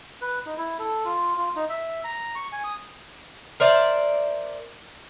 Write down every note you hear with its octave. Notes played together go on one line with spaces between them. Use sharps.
B4
D#4
E4
A4
F4
F4
D#4
E5
A#5
C#6
G#5
D#6
A#4 C5 D5 E5